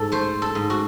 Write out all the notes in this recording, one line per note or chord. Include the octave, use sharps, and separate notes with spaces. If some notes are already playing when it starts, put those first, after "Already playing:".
Already playing: G#2 A4
A3 C5
A4
G#2
F#4